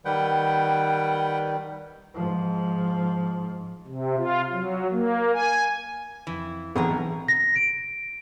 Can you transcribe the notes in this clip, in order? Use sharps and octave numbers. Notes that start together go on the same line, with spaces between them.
D#3 G3 B4 F#5 G5
G#2 F3
C3
F4
F#3
A#3
G#5
F2 E3
B1 E3 C4 D4 D#4 G#4 G5 A#5
A#6
D7